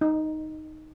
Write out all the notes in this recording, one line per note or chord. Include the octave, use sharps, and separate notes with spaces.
D#4